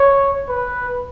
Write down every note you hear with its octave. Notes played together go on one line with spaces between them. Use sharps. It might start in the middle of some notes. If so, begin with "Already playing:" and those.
Already playing: C#5
B4